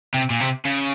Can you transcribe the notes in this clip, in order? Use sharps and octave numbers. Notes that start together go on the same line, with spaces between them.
C3
A#2
C3
C#3